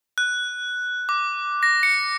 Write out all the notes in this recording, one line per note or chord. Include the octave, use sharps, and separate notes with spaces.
F#6
D6
A#6
C#7